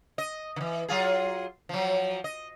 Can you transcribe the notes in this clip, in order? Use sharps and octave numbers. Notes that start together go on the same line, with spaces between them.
D#5
D#3 E3
F#3 F4 G#4
F3 F#3
D#5